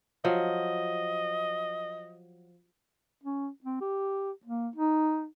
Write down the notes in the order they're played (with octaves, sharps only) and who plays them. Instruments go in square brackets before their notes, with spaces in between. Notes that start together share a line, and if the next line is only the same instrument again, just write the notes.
[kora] F3 F#3 [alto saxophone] D#5
[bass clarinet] C#4
C4
G4
A#3
D#4